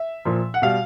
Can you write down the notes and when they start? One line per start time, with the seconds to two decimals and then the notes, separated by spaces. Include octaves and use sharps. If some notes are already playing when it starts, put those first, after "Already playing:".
Already playing: E5
0.25 A#2 F3
0.54 F#5
0.62 B2 G3 F5